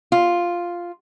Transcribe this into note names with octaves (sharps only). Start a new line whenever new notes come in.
F4